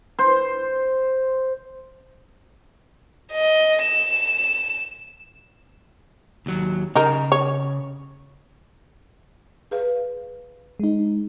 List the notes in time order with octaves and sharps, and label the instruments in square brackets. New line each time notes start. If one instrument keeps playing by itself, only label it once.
[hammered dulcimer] C5
[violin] D#5
E7
[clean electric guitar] D#2 F#3
[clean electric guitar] C#3 [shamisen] D#4 A#4
[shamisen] C#5
[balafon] G#4 B4 F5
[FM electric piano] G#3 D#4